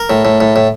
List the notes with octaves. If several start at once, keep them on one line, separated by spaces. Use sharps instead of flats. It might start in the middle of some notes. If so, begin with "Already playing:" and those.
Already playing: A#4
A2
A2
A2
A2